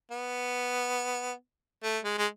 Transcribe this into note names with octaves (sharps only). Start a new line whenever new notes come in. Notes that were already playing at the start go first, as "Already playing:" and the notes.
B3
A3
G#3
G#3